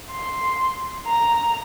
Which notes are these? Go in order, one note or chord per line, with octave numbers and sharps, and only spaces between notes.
C6
A#5